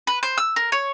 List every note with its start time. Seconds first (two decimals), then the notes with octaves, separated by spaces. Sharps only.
0.07 B4
0.23 C5
0.37 E6
0.56 A#4
0.72 C#5